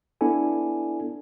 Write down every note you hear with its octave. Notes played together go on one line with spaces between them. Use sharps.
B3 D4 E4 A4 G#5